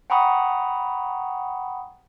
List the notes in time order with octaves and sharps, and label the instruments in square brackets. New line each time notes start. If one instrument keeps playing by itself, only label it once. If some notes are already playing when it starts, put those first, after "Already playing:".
[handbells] F#5 G5 A#5 B5 C#6 D#6